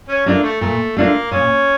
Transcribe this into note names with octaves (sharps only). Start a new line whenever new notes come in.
C#4
A3 A#3 D4 F4
A3
A#2 A3
A3 A#3 D4 F4
A#2 C#4